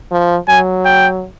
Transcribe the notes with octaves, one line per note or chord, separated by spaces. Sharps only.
F3
F#3 G#5
G5